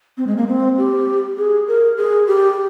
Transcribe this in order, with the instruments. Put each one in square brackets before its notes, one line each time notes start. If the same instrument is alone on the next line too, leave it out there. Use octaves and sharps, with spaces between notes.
[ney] C4
G#3
A#3
C4
G4
G#4
A#4
G#4
G4